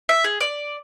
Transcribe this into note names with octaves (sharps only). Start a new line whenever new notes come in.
E5
G#4
D5